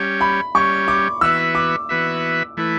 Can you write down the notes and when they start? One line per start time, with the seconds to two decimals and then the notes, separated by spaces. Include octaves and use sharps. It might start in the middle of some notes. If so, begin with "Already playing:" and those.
Already playing: G3 C#4 G4 C#5
0.21 B5
0.55 G3 C#4 G4 C#5 C#6
0.88 D6
1.21 E3 B3 F#4 B4 E5 E6
1.55 D6
1.89 E3 B3 F#4 B4 E5
2.57 E3 A3 E4 B4